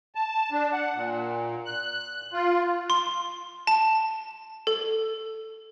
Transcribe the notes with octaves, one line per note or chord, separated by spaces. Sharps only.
A5
D4
F#5
A#2
F#6
F4
C6
A5
A4